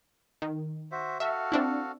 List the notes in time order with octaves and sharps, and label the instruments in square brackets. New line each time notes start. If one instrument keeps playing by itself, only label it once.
[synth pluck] D#3
[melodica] F#4 C5 E5
[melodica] F#4 A4 F5 [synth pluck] E5
[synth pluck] C4 D4 E4